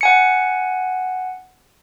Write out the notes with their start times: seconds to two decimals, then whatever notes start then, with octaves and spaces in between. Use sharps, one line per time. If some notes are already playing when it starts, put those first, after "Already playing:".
0.01 F#5 G#5 C#7